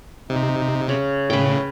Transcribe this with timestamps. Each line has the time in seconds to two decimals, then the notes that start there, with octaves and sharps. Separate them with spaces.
0.30 C3 D#4
0.89 C#3 C#5
1.30 A2 C#3 B4 G5